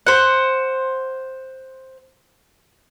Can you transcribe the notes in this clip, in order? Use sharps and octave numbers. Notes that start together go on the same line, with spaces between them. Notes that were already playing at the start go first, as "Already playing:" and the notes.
C5 F#5